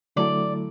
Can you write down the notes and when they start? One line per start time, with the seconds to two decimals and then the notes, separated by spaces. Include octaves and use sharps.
0.16 D3 F#3 A3 E4 A4 D5